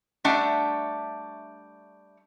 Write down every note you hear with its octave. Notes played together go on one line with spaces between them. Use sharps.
G3 A3 D4 E5 F#5